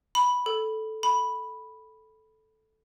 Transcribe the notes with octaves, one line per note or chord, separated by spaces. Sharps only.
B5
A4
B5